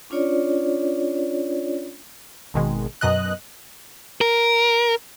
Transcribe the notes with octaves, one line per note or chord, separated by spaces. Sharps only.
C#4 D4 F4 C#5 D5
G#1 B2 D#3 G#3
F#2 B2 D#5 F#6
A#4